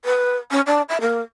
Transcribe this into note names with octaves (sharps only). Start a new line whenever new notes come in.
B4
C#4
D4
E5
A#3